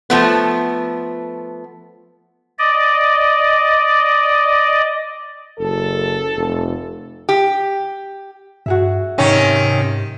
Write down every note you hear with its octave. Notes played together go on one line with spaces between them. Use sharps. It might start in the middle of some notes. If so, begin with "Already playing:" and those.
F3 A3 B3
D5 D#5
F#1 A4
F1
G4
G2 F#4 G#4 E5
G#2 C3 D#3 C#4